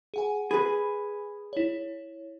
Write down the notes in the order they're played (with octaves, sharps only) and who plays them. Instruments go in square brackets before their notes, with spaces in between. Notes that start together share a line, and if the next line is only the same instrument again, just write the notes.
[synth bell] G#4 F#5 G#5
[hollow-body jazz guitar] G#4 B4 [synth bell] B5
[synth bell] E4 C#5